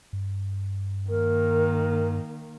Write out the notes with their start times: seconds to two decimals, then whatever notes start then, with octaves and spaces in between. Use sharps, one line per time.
0.13 G2
1.09 D#3 A#3 A#4